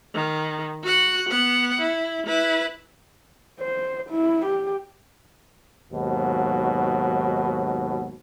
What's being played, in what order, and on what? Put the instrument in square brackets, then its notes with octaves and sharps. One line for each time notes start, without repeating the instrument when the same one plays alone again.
[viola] D#3
F#4 F#5
B3 F#5
E4
E4 B4
[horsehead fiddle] C5
E4
G4
[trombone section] D#2 G#2 B2 F#3